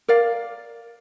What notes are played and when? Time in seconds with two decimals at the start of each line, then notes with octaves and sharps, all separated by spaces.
0.08 A#4 D5 F5